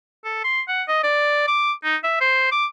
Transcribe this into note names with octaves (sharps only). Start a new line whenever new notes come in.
A4
C6
F#5
D#5
D5
D6
D#4
E5
C5
D6